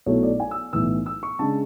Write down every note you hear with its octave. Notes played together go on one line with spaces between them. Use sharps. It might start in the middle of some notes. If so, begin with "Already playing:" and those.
B1 B2 F#3 A3 E4 C#5
D5
G#5
E6
B1 A2 E3 E6
E6
C#6
C#3 G#3 D4 A5